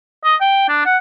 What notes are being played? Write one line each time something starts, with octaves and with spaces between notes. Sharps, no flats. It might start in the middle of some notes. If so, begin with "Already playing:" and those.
D#5
G5
D4
F#5